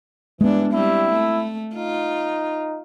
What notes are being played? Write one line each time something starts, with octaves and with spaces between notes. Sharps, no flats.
G2 E3 G#3 B3 D4
G3 C4 E4
A3
D#4 F4